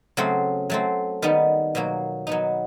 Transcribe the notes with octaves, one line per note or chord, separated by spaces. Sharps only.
C#3 F#3 A3 C4
F#3 A3 C4
D#3 G3 B3 D#4
B2 F#3 A#3
F#3 B3 D#4